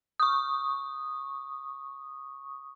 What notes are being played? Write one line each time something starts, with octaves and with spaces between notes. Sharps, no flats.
C#6 D#6